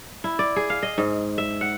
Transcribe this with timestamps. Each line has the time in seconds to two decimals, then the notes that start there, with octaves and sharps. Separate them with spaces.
0.24 E4
0.39 D5
0.56 G#4
0.70 F5
0.83 D#5
0.98 G#2
1.38 E5
1.61 F#5